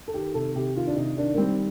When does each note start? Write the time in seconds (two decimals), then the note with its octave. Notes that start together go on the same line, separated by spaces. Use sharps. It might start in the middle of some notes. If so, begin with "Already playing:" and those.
0.08 A4
0.14 D#3 G4
0.34 C3 A4
0.55 C3 G4
0.76 D#3 F4
0.87 D4
0.96 C3 D#4
1.17 D#3 D4
1.34 A#3
1.37 G3 C4